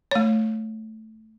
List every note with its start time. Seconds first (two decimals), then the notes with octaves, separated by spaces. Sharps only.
0.11 A3 C#5